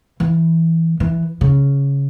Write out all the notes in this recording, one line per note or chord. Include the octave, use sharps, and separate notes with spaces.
E3
E3
C#3